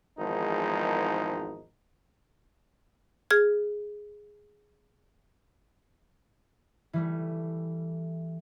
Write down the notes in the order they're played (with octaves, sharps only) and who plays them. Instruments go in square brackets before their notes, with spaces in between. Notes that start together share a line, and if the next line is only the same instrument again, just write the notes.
[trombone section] G#1 E2 G#2 F3 D#4 A#4
[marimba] G#4 F6 G#6
[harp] E3 G3 A3